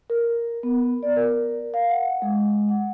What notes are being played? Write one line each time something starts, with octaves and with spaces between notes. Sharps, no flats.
A#4
B3
D5
A#4
F5
F#5
G#3
F#5